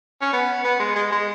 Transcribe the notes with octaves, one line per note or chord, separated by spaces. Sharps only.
C#4
B3
B3
G#3
G#3
G#3